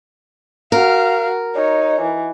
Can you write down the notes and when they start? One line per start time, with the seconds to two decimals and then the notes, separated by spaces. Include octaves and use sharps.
0.72 F#4 A#4 F5
1.55 D#4 C#5
2.01 E3